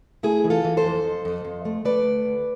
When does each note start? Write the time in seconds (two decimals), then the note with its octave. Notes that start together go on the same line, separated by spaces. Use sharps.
0.23 A3 E4 G#4
0.44 E3
0.50 F4 A4
0.64 E3
0.77 A4 C5
0.84 F2
1.04 F2
1.25 F2
1.45 F2
1.65 A3
1.85 A3 B4 D5
2.05 D2
2.25 D2